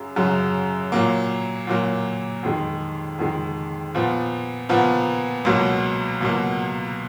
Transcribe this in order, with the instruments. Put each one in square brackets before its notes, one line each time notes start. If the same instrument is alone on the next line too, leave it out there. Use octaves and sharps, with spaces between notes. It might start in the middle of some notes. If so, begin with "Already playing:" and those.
Already playing: [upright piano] F#2 C#3 F#3
F#2 C#3 F#3
A#2 F#3 A#3
A#2 F#3 A#3
F2 D#3 G#3
F2 D#3 G#3
A#2 F3 B3
A#2 F3 B3
C#2 B2 F#3 A#3
C#2 B2 F#3 A#3